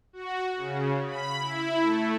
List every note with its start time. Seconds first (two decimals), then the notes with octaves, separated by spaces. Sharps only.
0.13 F#4
0.56 C#3
1.07 B5
1.40 E4
1.82 A3